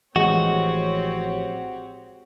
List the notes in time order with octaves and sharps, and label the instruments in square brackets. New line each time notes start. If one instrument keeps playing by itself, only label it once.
[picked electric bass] A1 E3 F3 [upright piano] G#3 [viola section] C4 G4 C#5 [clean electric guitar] F#4